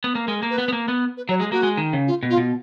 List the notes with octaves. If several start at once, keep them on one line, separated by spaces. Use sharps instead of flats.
B3
A#3
G#3 A#4
A#3
B4
B3
B3
A#3
B3
B4
F#3 C#5
G#3 G#4
A#3 F#4
G#3
D#3
C#3
F4
B2
F4
B2